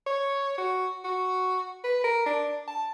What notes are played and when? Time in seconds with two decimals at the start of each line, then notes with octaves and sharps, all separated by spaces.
0.06 C#5
0.58 F#4
1.04 F#4
1.84 B4
2.04 A#4
2.26 D4
2.68 A5